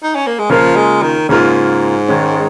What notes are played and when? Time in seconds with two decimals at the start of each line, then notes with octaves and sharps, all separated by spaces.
0.03 D#4
0.15 C#4
0.27 A#3
0.39 G#3
0.50 C#3 F3 A#3 F4 A#4
0.76 G#3
1.03 D#3
1.29 G#2 C#3 A#3 F4 A#4
2.08 D#3 G#3 C#4